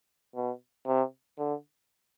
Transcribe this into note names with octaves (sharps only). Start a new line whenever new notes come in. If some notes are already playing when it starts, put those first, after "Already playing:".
B2
C3
D3